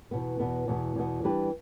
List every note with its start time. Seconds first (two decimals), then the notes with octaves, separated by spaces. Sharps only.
0.11 E2 B2 B3
0.39 E2 B2 B3
0.68 E2 B2 B3
0.96 E2 B2 B3
1.24 E3 G3 D4 G4 B4